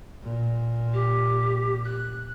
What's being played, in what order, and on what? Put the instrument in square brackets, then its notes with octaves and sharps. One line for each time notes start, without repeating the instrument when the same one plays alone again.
[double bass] A#2
[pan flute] G4
F#6